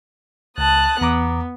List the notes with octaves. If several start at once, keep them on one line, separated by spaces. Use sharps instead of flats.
C#2 A5 D#6 F#6
E2 B3 A#5 D6